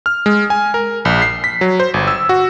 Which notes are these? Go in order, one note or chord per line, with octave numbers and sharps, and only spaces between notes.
F6
G#3
G#5
A#4
A#1
C7
B6
F#3
C5
G1
E6
F#4